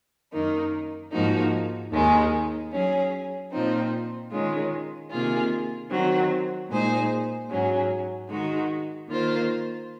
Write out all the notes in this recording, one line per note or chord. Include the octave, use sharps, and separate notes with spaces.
F#2 D#3 A#3 D#4
G#2 F3 A#3 D#4 F#4
D#2 D#3 G#3 D#4
F#3 C#4 G#4
A#2 F3 C4 D#4
D#3 G#3 C#4 F4
C3 D#3 A#3 F4 G#4
D#3 F#3 C4
A#2 G#3 D#4 G#4 C5
G#2 F#3 C#4 G#4
D#3 G#3 D#4 F#4
D#3 A#3 F4 C5